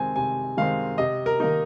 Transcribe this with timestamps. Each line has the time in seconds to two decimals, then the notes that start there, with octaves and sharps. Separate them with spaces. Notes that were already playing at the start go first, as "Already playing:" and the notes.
Already playing: C3 D#3 G#3 C4 G#5
0.16 C3 G#5
0.57 D#3 G#3 C4 F5
0.98 C3 D#5
1.26 A#4
1.40 D#3 A#3 D#4